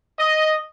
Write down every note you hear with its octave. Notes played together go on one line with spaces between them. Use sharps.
D#5